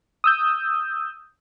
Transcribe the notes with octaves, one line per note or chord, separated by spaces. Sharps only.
D#6 E6 G6